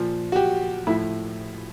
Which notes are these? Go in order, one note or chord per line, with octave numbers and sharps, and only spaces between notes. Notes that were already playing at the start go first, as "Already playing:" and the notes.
Already playing: A#2 F3
F#4
G4
A2 F3 E4